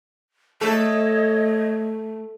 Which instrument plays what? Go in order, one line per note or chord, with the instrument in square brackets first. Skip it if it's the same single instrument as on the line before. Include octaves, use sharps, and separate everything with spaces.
[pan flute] A3 [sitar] A4 [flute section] C#5 D#5